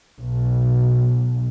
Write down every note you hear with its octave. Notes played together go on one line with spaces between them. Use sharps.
B1